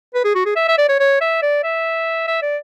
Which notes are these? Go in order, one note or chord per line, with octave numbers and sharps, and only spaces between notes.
B4
G#4
F#4
G#4
E5
E5
D5
C#5
C#5
E5
D5
E5
E5
D5